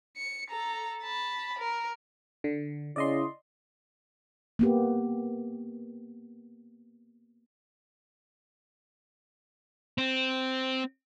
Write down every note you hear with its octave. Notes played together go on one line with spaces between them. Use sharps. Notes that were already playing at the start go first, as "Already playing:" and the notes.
C#7
A4 A#5
A5 B5
A#4
D3
C#3 C#4 E4 D5 D#5 C6
A#3 B3 G4
C4